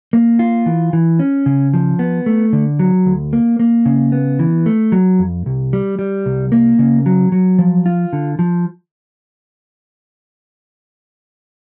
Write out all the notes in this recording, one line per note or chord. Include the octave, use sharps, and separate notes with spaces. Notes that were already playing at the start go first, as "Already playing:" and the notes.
A#3
F4
E3
E3
C#4
C#3
F3
B3
A3
D3
F#3
D2
A#3
A#3
C#3
B3
E3
A3
F#3
F2
C2
G3
G3
C2
A#3
C#3
F#3
F#3
F3
F4
D3
F3